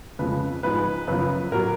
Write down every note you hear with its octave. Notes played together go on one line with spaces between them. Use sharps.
F2 C#3 F3 G#3 B4
G#2 F3 G#3 B4
F#2 C#3 F3 B4
A#2 F#3 A#4